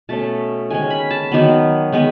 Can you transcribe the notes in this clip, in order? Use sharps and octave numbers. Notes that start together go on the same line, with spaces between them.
B2 A3 C#4 A5
D#3 G#3 C#4 G#5
B5
A5
D#3 F#3 B3
D#3 G#3 B3